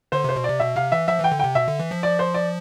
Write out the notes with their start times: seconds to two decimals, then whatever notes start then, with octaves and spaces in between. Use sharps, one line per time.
0.12 D3 C5
0.24 C3 C5
0.36 B2
0.44 C3 D5
0.60 B2 E5
0.76 C3 F5
0.92 E3 E5
1.08 F3 E5
1.20 E3 G5
1.32 D3
1.39 C3 G5
1.55 B2 E5
1.68 D3
1.79 E3
1.91 F3
2.03 D5
2.19 C5
2.34 D5